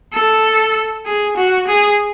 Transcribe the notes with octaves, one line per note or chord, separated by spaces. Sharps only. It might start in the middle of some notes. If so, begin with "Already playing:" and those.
A4
G#4
F#4
G#4